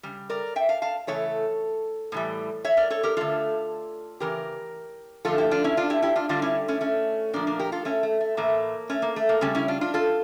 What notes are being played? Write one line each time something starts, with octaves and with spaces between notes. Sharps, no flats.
C#3 G3
A#4 D5
E5 G5
F5 A5
F5 A5
C#3 E3 A3 A4 C#5
A2 E3 G3
C#5 E5
A#4 D5
A4 C#5
G4 A#4
D3 A3 F4 A4
C#3 E3 G4 A#4
D3 F3 A3 F4 A4
E4 G4
D4 F4
C#4 E4
D4 F4
E4 G4
E4 G4
D4 F4
D3 G3 D4 F4
C#4 E4
A3 C#4
A3 C#4
A#2 F3 A3 A#3 D4
A#3 D4
G4 A#4
F4 A4
A3 C#4
A3
A3
A2 E3 A3 A#3
A3 C#4
A#3
A3
A#3
C#3 G3 A3 C#4
C#4 E4
D4 F4
D4 F4
F4 A4